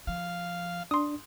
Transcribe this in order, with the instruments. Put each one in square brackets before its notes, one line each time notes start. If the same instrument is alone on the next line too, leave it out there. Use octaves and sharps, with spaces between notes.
[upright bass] F3 [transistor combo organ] F5
[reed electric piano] D4 [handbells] C6 D#6